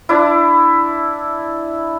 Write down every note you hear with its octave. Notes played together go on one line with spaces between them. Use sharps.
D4 E4